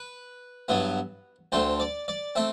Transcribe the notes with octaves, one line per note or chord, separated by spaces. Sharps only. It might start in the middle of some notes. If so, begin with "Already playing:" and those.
Already playing: B4
G2 F#3 B3 E4
D2 D3 A3 C4 C5
D5
D5
A3 C4 E5